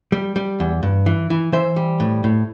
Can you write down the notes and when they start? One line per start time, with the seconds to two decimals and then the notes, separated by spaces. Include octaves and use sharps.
0.12 G3
0.36 G3
0.60 E2
0.83 G2
1.06 E3
1.30 E3
1.52 E3 C5 E5
1.76 G3
2.00 A2
2.24 A2